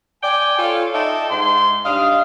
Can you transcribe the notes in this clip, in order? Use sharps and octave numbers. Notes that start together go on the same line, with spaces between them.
D5 G5 G#5
F4 A4 C#5
D#4 D5 E5 G5 A5
G#2 C6
G3 D4 D#5 F5